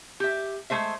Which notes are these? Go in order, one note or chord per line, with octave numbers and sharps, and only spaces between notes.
G4 E5
G#3 A3 C5 E5